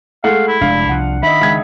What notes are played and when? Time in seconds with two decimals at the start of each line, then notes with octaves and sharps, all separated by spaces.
0.24 G#3 A3 F5 F#5
0.48 E4
0.61 F1 G#3 D4 F5
0.89 C2 F3 F#5
1.23 D#3 D#5 E5 B5
1.41 C#2 G#6